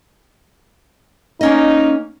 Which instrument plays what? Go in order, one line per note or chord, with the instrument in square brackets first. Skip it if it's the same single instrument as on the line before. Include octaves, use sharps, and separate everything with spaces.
[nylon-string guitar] A#3 C#4 D#5 [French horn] D#4